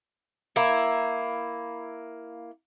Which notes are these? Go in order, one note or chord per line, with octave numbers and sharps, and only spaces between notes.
A#3 E4